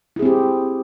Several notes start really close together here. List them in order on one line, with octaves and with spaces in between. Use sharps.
E4 G#4 C4 G4